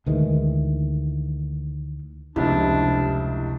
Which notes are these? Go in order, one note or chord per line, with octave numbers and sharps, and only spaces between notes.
D2 D#3 E3 G#3
F1 C#2 C3 D4 E4 G4 E5